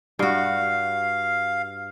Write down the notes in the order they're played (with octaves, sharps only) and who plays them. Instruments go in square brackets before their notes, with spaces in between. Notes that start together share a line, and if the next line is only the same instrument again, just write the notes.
[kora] G2 F#4 [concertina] F5